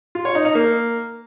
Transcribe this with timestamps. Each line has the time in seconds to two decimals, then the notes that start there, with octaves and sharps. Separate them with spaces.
0.15 F4
0.25 C#5
0.35 D#4
0.45 D#4
0.55 A#3